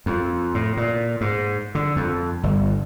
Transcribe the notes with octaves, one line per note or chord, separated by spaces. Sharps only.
F2
A2
A#2
G#2
D3
F2
G1